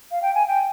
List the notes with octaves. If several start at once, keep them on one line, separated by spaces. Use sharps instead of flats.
F5
G5
G#5
G5